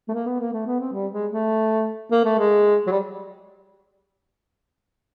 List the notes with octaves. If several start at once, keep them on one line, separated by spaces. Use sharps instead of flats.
A3
A#3
B3
A#3
A3
B3
C4
G3
G#3
A3
A#3
A3
G#3
F#3
G3